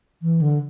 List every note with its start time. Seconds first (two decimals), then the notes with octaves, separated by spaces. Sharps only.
0.22 E3
0.42 D3